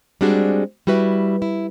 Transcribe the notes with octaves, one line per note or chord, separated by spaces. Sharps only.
G3 G#3 C4 D4 F#4 G#4
G3 E4 F#4 B4 E5
E4